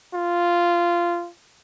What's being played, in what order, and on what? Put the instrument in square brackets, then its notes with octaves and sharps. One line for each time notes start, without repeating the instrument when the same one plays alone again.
[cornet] F4